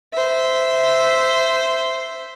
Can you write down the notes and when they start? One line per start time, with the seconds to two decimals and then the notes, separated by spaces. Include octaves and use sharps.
0.13 C5 E5